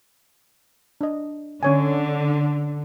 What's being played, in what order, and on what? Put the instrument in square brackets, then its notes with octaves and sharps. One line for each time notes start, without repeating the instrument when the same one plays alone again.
[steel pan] D4 D#5
[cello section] D3 [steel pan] C#4 C#5 G#5